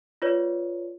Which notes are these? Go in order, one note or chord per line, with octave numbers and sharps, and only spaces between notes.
F4 B4 C#5 D5